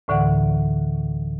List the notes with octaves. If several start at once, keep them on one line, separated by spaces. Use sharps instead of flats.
D2 A2 D3 E3 D5 F#5